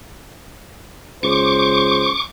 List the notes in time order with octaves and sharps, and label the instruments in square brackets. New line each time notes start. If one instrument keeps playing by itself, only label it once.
[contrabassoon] C#2 [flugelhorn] C5 [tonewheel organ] C#6 D6